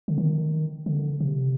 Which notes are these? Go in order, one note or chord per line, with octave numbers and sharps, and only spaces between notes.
D3
D#3
D3
C3